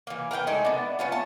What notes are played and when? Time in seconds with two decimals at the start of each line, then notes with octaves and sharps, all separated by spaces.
0.07 E3 A#3
0.31 A#4 B4 F#5 G5
0.47 G#3 A3 D4 D#4
0.65 B3 D4
0.99 B3 C#4 F4
1.12 A3 A5